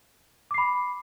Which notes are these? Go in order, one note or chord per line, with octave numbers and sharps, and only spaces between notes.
B5 D6 C7